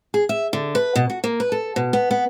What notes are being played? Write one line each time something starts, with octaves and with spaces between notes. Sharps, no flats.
G#4
E5
D3
B4
B2
F#4
A#3
B4
A4
B2
B3
B3